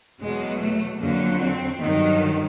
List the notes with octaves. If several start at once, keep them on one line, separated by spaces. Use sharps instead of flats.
E2 B2 F#3 G#3
A3
F2 D3 F#3 A#3
C4
G2 D#3 F#3